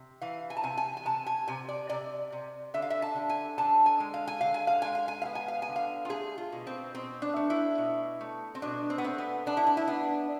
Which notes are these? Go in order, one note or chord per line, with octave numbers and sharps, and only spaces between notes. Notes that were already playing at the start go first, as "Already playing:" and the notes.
Already playing: C3
E3 F5
G#5
A5
C3 G#5
G#5
G#5
C3 A5
G#5
C3 G#5
D5
C3 D5
C3
D3 E5
F5
E5
A5
D3
G#5
D3 A5
G#5
G#3
F5
G#5
D3 F5
G#5
F5
G#3 G#5
F5
G#5
F5
B3
G#5
F5
G#5
D3
F5
F4
A3 G#4
F4
B2
C4
B2 C4
D4
A3
E4
B2
A3
C4
B2 D4
C4
B3
A3 C4
B3
B3 D4
E4
D4
E4
B3 D4